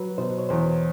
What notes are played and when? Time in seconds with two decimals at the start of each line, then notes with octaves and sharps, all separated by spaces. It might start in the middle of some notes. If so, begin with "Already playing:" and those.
Already playing: F#3 B4
0.18 B2 C5
0.38 C#5
0.49 E2 C5